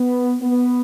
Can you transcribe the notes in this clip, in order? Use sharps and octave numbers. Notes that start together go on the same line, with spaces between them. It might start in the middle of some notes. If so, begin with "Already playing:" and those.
Already playing: B3
B3